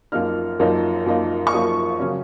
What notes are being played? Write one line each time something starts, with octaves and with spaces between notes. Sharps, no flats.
F#2 F3 A#3 D#4 F6
F#2 F3 A#3 D#4
F#2 F3 A#3 D#4
C#6
F#2 F3 A#3 D#4 D#6
C#3 F#3 C#4